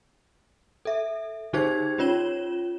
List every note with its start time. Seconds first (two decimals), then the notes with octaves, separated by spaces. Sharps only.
0.85 A4 E5
1.53 D3 D#4 G4 G#4 C5 G#6
1.98 C#4 F4 C#5 E7 G7